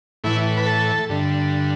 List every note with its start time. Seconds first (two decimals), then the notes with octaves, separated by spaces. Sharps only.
0.24 A2 E3 E4
0.57 B4
0.66 A4
1.09 G2 D3